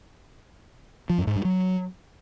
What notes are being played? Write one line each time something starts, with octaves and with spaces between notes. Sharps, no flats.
F3
F#2
G#2
G2
F#3